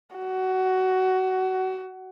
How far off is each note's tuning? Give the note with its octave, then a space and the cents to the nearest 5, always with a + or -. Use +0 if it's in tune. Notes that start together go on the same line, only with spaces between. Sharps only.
F#4 +20